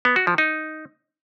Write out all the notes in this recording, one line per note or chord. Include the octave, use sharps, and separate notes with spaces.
B3
F#4
F3
D#4